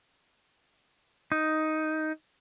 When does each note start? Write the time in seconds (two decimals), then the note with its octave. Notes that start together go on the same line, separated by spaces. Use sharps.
1.32 D#4